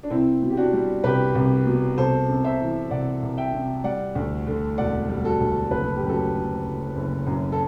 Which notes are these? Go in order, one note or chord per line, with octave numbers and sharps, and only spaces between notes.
D4
C2 C4 E4
B2
G4
D4 F#4
G3
C2 G4 B4
C2
B2
C2 A4 C5
C3
C5 E5
E3
C2 D5 F#5
C2
E5 G5
C3
G3 D5 F#5
D2
D3
E1 D5 F#5
G3
F#4 A4
D2
F#1 B4
A4
G4
F#2
F#4 A4
D3
F#1
F#1
F#2
A4